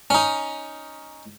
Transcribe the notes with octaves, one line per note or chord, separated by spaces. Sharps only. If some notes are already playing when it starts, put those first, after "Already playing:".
C#4 D#4